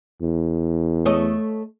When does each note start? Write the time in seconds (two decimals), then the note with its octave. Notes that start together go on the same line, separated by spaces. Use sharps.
0.21 E2
1.05 A3 C#5 D#5